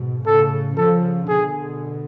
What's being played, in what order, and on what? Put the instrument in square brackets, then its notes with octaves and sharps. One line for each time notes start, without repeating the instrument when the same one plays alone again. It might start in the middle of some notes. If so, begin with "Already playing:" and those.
Already playing: [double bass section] G#2 B2
[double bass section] A2 C#3 [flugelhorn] A4
[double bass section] C#3 F3 [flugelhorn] A4
[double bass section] B2 D3 [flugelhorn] G#4